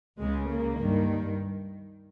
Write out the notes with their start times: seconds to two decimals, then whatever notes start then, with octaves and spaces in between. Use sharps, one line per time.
0.20 C#2 C#3 G#3
0.50 A#3
0.80 G2 D#3